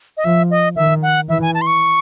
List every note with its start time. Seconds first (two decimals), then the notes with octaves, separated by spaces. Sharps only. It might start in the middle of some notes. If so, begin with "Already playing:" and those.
0.17 D#5
0.24 F3 E5
0.51 D#5
0.76 D#3 E5
1.03 F#5
1.28 E3 E5
1.42 G#5
1.54 A5
1.61 C6
1.67 C#6